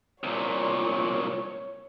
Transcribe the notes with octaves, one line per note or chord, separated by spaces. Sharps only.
C2 A#2 C#5